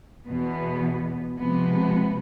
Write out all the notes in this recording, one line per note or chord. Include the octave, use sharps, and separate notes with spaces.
E2 B2 B3
C3 F3 G#3 B3